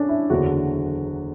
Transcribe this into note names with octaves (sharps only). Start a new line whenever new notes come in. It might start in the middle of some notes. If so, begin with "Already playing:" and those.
Already playing: C#4 D4
E4
F#1 E2 D3 F#3 F#4